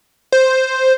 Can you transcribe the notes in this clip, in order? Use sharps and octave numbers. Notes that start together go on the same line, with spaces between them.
C5